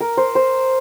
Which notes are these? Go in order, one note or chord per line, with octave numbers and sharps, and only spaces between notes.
A#4
C5
C5